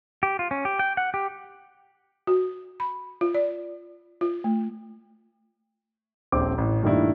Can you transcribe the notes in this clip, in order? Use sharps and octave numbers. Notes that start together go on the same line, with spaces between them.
G4
F4
C#4
G4
G5
F#5
G4
F#4
B5
F4
D5
F4
A3
D#1 A#1 C4 D6
A1
G2 A#2 D#3 A3 D4 E4